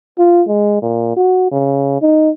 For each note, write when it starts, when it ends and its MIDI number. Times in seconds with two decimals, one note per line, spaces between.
0.18 0.43 65
0.48 0.79 56
0.82 1.15 46
1.16 1.49 66
1.51 1.98 49
2.02 2.30 63